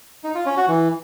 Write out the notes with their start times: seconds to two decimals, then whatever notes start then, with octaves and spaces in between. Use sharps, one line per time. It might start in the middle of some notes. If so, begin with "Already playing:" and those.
0.24 D#4
0.35 F4
0.46 C#4
0.57 F#4
0.68 E3